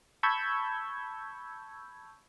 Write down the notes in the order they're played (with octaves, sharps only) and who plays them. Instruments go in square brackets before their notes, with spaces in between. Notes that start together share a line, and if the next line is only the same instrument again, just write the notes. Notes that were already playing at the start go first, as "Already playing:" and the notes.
[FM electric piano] A5 B5 C#6 E6 G6 G#6